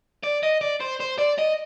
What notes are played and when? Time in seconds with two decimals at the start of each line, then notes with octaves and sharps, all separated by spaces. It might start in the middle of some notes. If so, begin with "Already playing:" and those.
0.23 D5
0.43 D#5
0.61 D5
0.81 C5
1.00 C5
1.19 D5
1.39 D#5